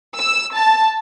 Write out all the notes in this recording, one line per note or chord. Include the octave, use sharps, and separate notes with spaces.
E6
A5